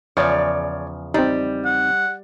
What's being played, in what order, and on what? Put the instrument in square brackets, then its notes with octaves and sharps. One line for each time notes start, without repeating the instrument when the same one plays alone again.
[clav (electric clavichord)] E2 C#3 F3 [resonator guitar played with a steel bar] C#5 D5
[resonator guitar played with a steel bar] G3 [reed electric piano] C4 D#4
[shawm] F#5